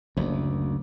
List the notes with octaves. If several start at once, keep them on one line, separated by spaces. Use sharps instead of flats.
F#1 D2